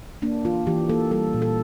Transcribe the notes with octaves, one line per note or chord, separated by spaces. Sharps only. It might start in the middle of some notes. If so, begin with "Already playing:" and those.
A#3 D4
E3 F4
E3 G4
A#3 A4
G3 A4
A#2
A4